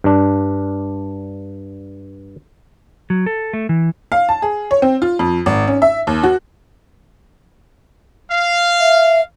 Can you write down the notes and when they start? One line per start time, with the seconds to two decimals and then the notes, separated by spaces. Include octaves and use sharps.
0.04 G2 D4
3.10 F#3
3.26 A4
3.53 A3
3.69 E3
4.12 F5
4.29 A5
4.42 G#4
4.71 C#5
4.82 C4
5.02 F4
5.19 F2
5.46 G#1
5.67 C#4
5.82 E5
6.07 D#2
6.23 F#4
8.30 F5
8.80 E5